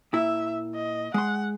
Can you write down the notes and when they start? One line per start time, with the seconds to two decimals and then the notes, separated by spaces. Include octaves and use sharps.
0.13 A#2 E4 E5
0.74 D#5
1.14 G#3 F#5 C6